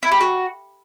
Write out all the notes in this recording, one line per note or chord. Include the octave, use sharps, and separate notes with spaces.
E4
G4
F#4